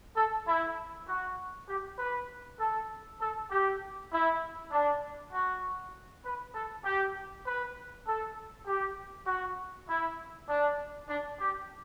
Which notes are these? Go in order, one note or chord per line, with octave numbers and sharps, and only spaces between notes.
A4
E4
F#4
G4
B4
A4
A4
G4
E4
D4
F#4
B4
A4
G4
B4
A4
G4
F#4
E4
D4
D4
G4